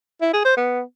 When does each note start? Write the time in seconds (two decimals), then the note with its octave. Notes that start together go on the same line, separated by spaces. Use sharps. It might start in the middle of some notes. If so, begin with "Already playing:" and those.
0.21 E4
0.33 G#4
0.45 C5
0.57 B3